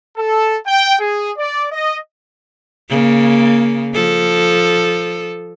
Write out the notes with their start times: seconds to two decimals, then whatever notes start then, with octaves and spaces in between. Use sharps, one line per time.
0.17 A4
0.67 G5
0.99 G#4
1.38 D5
1.72 D#5
2.89 C#3 A#3
3.94 F3 A4